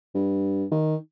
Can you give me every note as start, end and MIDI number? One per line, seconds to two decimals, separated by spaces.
0.15 0.64 43
0.71 0.95 51